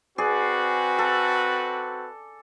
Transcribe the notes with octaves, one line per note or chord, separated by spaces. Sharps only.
C4 F#4 G#4 B4 D5
A4